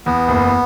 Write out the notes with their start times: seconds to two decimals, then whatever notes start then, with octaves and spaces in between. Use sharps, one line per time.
0.06 E2 B3
0.28 F#1